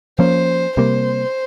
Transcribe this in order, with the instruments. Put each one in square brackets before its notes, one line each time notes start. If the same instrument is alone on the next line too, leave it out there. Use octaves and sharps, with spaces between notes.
[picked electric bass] F3 A#3 C#4 [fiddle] C5
[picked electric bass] C3 G3 A#3 [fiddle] C5